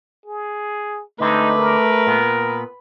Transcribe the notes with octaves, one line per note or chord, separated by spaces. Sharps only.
G#4
D3 G#3 A3 C4 D#4 B4
A#4
A#2 B3